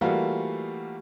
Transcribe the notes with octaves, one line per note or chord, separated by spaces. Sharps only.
E3 G3 A3 A#3 F4 F#4